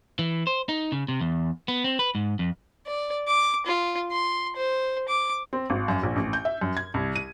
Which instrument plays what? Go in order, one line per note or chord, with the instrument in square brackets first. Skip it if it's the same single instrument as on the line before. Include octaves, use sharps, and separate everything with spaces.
[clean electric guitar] E3
C5
D#4
C#3
C3
E2
B3
C4
B4
G#2
F2
[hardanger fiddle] D5
D6
F4
C6
C5
D6
[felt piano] C4
G#1
F#2
A#1
A1
G6
E5
F#2
G#6
C2
D#7